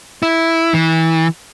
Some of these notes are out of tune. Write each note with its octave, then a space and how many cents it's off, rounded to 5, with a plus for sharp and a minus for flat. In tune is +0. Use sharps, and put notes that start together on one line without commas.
E4 -5
E3 -25